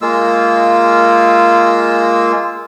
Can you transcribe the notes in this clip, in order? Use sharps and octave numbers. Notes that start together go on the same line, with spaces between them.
G#3 A#3 F4 E6